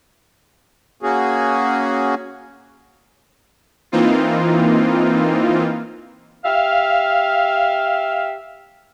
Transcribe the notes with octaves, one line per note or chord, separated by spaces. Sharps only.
A#3 C#4 F#4 G#4
E3 A#3 C4 D#4 F4
G4 E5 F5